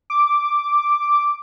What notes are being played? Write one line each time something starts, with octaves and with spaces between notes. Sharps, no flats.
D6